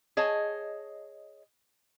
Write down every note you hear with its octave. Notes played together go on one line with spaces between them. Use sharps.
G#4 C#5 D#5 A5